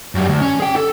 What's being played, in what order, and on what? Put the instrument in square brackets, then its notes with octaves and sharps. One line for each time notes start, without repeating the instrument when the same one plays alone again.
[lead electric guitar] F#2 G3
D2
C#4
G#4 G5
A4